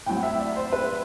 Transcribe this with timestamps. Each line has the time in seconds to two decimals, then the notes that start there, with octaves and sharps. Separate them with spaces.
0.06 A2 F#3 C4 G5
0.17 F#5
0.23 E5
0.40 D5
0.56 C5
0.72 B4